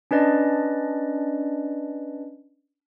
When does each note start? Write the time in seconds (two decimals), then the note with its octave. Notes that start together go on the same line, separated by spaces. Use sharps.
0.11 C#4 D4 B4 D5 D#5